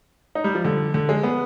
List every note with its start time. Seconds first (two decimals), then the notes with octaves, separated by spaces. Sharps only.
0.35 D#4
0.44 G3
0.55 F3
0.65 D3
0.94 D3
1.09 G#3
1.23 B3